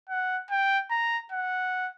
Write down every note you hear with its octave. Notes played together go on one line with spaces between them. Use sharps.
F#5
G5
A#5
F#5